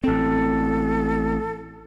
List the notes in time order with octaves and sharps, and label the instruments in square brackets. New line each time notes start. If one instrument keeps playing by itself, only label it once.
[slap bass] A1 C4 [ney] A4